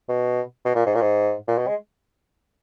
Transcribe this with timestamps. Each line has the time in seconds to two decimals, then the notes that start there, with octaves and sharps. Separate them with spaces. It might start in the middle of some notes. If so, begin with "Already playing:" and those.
0.09 B2
0.65 B2
0.75 A#2
0.86 G#2
0.95 A#2
1.02 G#2
1.48 A#2
1.58 B2
1.68 G#3